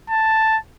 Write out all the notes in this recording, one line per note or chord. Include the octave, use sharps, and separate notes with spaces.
A5